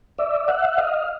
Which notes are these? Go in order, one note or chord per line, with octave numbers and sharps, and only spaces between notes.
D5 E5
E5 F#5
D#5 F5